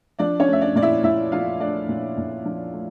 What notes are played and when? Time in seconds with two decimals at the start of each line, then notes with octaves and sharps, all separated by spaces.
0.19 F3 D4 D5
0.40 C#4 C#5
0.48 A3
0.53 E5
0.61 D4 D5
0.76 A#2 D5
0.82 E4 E5
1.04 A#2 E4 E5
1.32 F3 F4 F5
1.60 A3 D4 D5
1.89 A#2
2.17 A#2
2.45 F3
2.73 A3